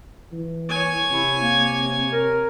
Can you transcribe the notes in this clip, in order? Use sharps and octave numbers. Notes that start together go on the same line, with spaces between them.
E3
C#5 G#5
C3 E4
A#3
A#4